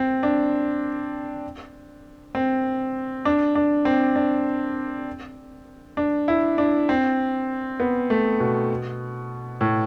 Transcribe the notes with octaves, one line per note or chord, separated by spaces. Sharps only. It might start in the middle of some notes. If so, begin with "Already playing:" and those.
Already playing: C4
D4
C4
D4
D4
C4
D4
D4
E4
D4
C4
B3
A3
B2
A2